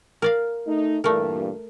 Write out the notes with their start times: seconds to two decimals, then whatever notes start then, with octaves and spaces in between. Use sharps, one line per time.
0.22 A#4 D5 F5
0.66 A3 D#4 D#5
1.04 G2 A#2 E3 A3 A#4